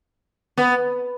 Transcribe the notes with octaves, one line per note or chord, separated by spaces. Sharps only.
B3